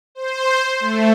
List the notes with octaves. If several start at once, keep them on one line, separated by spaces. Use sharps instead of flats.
C5
A3